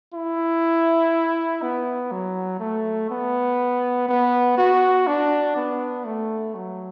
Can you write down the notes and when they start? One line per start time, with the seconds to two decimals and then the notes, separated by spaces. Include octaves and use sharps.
0.14 E4
1.62 B3
2.12 F#3
2.60 A3
3.10 B3
4.09 B3
4.58 F#4
5.07 D4
5.56 B3
6.05 A3
6.55 F#3